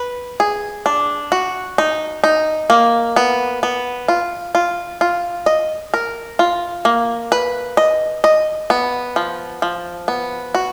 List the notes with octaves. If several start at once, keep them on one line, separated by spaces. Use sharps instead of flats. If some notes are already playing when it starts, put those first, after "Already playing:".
Already playing: B4
G#4
D4
F#4
D#4
D#4
A#3
B3
B3
F4
F4
F4
D#5
A#4
F4
A#3
B4
D#5
D#5
B3
F3
F3
B3
F#4